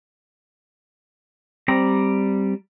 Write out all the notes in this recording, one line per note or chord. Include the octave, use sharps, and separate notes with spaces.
G3 C4 D5 A#5